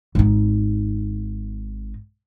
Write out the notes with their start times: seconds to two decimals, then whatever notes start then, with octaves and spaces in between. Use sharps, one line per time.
0.15 G#1 D#4